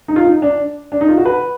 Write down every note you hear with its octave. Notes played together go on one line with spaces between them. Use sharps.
D#4
F4
D#4
D4
D4
D#4
F4
F#4
B4